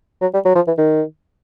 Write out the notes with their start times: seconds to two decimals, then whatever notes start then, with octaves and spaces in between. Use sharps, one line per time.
0.22 F#3
0.34 G3
0.45 F#3
0.55 F3
0.67 E3
0.78 D#3